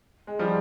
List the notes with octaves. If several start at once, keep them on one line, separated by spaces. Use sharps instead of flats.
G#3
F3 G3